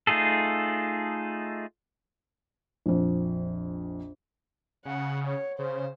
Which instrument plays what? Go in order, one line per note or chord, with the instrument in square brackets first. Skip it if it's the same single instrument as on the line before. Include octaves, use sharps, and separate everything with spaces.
[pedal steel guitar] A3 D#4 F4 G#4 A4
[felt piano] A#1 F2
[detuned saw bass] C#3 [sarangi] F#5
[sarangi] C#5
[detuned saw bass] C#3 [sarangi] C5